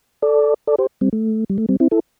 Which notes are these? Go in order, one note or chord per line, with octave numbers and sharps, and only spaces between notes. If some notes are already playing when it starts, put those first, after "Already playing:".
A4 D5
A4 D5
G4 C5
G3 C4
A3
G3
A3
G3 C4
C4 E4
E4 A4